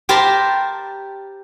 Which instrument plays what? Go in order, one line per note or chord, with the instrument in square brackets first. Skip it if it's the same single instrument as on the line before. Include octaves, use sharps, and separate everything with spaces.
[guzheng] G4 A#4 C5 A5 B5